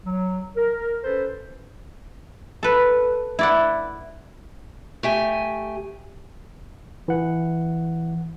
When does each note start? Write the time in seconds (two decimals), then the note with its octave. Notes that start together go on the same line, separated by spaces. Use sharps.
0.05 F#3
0.56 A#4
1.03 C#4 A4 B4 C5
2.63 A4 B4
3.39 E4 D5 F#5
5.03 A3 G4 G#5
7.08 E3 F#5